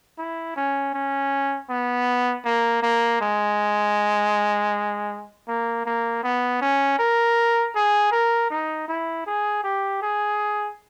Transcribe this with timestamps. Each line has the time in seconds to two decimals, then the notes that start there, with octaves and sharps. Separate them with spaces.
0.18 E4
0.56 C#4
0.94 C#4
1.70 B3
2.45 A#3
2.83 A#3
3.21 G#3
5.48 A#3
5.86 A#3
6.23 B3
6.62 C#4
6.99 A#4
7.75 G#4
8.12 A#4
8.50 D#4
8.88 E4
9.27 G#4
9.64 G4
10.02 G#4